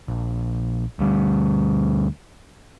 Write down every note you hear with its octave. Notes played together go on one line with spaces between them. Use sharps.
A#1
D2 G3